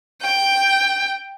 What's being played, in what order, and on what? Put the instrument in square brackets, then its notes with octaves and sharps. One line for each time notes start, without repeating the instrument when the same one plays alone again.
[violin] G5